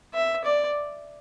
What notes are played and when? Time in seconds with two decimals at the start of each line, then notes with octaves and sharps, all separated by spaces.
0.14 E5
0.45 D5